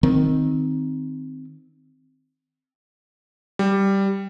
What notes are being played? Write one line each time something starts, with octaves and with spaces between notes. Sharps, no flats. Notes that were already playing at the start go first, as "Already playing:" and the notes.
D#3 C4
G3